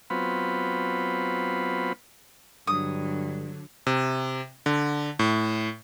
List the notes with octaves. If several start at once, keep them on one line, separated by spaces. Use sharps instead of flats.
F#3 B3 C4 F4 B5
G2 D3 F#3 D#6
C3
D3
A2